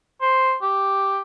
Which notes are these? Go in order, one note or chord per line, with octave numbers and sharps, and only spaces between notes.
C5
G4